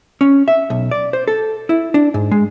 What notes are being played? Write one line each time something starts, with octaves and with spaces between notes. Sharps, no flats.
C#4
E5
B1
D5
C5
A4
E4
D4
G#2
G#3